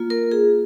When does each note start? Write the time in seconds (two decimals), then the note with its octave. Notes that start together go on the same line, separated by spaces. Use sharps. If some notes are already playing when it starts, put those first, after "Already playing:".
Already playing: A#3 F4
0.10 A#4
0.31 G#4